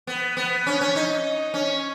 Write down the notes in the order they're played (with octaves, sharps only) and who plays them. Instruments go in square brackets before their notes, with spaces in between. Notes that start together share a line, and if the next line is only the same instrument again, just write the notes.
[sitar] B3
B3
C#4
C#4
D#4
C#4